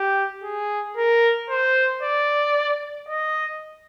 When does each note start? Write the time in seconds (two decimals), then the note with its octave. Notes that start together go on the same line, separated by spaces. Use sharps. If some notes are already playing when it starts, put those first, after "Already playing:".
Already playing: G4
0.43 G#4
0.97 A#4
1.49 C5
2.02 D5
3.09 D#5